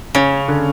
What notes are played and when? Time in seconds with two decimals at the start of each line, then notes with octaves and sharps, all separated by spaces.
0.15 C#3 C#4
0.48 D3